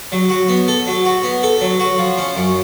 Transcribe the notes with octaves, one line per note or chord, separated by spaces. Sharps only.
F#3
F#4
B3
A4
F#3
F#4
B3
A4
F#3
F#4
F3
C#4
F#2